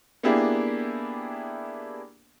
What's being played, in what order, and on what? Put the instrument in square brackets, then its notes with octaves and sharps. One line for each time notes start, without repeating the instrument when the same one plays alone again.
[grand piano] A#3 B3 D4 E4 G4 G#4